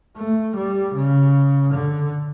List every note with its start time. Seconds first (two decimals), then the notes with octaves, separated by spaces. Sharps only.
0.17 A3
0.56 G3
0.95 C#3
1.74 D3